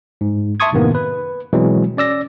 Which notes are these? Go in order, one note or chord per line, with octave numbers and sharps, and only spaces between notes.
G#2
E5 A5 C6 C#6 D#6 G#6
F#2 A2 C3 D#3 A#3 B3
B4
B2 E3 F#3 G#3 C4
C#4 D5 E6 A#6